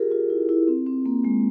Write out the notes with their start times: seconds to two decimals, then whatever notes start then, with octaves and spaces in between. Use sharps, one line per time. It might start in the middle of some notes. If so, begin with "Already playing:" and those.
Already playing: F4 G4 G#4 A#4
0.11 F4
0.30 E4
0.49 E4
0.68 C4
0.87 C4
1.06 A#3
1.25 G#3